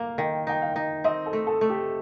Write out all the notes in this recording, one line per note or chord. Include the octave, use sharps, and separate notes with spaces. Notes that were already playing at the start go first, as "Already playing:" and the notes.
Already playing: A#3 F5
D#3 G5
D#4 G5
F5
D#4
C4 D#5
A4
A3
A4
A3
G4